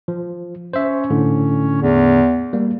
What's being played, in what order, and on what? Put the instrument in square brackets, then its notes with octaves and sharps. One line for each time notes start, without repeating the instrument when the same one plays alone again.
[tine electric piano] F3
[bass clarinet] C#4 [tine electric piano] C5 E5
[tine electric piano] A2 D3
[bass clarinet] E2
[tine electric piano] G3 A#3